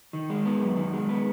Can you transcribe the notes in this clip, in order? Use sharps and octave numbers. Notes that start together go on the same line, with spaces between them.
D#3
G#3
B3
F#2
D#3
G#3
B3